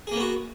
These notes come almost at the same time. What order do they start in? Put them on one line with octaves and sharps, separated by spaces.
G#4 A#3 B3 F#4